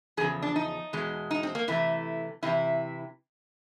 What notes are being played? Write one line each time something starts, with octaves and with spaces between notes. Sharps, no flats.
E2 C#3 F3 G#4
D4
D#4
E2 B2 G#3
D#4
C4
A#3
C3 E3 A3 E4
C3 E3 E4